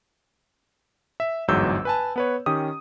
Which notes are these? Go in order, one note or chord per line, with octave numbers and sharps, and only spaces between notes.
E5
G1 E2 G#2 F#3 E6 G6
B4 G#5 A5
B3 B4 C#5
D#3 C#4 G4 D#6